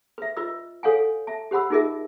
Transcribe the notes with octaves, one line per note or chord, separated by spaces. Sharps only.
B4 E5
F4 B4 D#5 E6
A4 C#5 F5 F#5 G#5
E5 A5
G4 C5 F#5 B5 E6
D#4 F4 G#4 A#4 D#5 E5